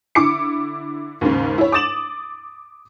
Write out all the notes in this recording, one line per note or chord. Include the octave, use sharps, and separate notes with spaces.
D3 E4 D6 C#7
D#2 G#2 C#3
E4 C#5
D6 D#6 A6 E7 F#7